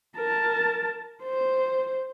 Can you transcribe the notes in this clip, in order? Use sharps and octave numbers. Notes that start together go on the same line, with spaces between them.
A#4 A5
C5